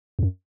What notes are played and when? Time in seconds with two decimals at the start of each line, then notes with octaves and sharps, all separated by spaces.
0.19 E2
0.23 F#2